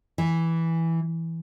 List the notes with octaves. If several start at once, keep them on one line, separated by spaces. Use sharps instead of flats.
E3